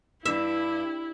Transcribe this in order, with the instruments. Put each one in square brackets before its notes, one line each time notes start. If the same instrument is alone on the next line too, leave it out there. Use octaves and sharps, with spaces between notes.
[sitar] G2 [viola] E4 [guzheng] E5